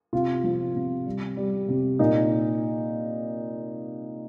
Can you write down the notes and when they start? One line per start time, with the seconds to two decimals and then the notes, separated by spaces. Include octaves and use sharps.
0.13 C3 F4
0.44 F3
0.75 C3
1.06 G3
1.37 G3
1.68 C3
1.99 A#2 D#4